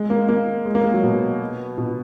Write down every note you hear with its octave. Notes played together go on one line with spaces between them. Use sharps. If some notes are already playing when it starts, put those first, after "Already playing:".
Already playing: G#3
A#3
A#3
G#3
A#3
G#3
F#3
B2
B2